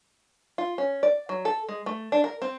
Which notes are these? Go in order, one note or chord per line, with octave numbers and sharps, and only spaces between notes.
F4
C#4
D5
F#3
A4
G#3
A3
D4
A#4
C4